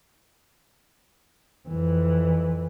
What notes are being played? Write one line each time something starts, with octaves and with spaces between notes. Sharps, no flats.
F2 E3